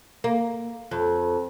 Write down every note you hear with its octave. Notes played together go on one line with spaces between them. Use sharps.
A#3
F2